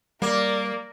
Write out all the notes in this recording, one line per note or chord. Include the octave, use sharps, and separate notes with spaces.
G3 A#3 A#4 D5